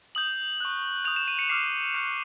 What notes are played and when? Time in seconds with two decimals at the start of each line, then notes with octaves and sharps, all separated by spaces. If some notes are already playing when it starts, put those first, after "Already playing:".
0.15 D#6 G6 F#7
0.60 C#6 F#6
1.05 D#6 G6 F7
1.16 E7
1.28 D#7
1.39 C#7
1.49 D6 F6 C7
1.94 C#6 F#6 C#7